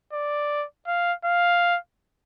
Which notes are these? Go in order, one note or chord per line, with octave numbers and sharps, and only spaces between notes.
D5
F5
F5